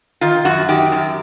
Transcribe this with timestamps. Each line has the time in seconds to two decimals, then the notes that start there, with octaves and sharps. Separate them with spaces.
0.21 D#3 F4
0.45 F#2 F#4
0.68 D#3 G4
0.92 F#2